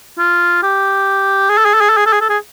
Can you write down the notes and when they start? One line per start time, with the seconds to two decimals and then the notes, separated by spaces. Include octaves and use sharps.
0.19 F4
0.63 G4
1.50 G#4
1.58 A4
1.65 G#4
1.74 A4
1.81 G#4
1.89 A4
1.97 G#4
2.06 A4
2.13 G#4
2.21 A4
2.29 G#4